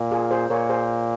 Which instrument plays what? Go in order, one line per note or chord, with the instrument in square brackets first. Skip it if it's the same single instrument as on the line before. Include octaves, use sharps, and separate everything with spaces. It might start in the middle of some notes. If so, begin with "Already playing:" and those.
Already playing: [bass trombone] A#2
[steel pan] F4 G#4
G#4 C5
[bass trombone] A#2 [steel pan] A#4 C#5
[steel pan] G#4 C5